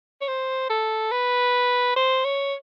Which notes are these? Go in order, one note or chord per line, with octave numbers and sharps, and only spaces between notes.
C#5
C5
A4
B4
C5
C#5